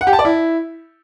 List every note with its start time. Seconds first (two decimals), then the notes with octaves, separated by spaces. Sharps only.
0.01 F#5
0.07 G4
0.13 A5
0.19 D5
0.25 E4